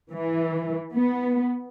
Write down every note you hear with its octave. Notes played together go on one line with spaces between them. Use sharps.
E3
B3